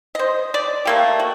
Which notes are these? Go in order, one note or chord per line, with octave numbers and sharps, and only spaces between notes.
C5 D#5
D5
A3 A#3 G4
F#4